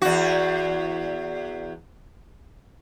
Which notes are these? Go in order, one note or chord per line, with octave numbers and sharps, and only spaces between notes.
E2 F#4